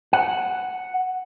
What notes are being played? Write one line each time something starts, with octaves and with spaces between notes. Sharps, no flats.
F#5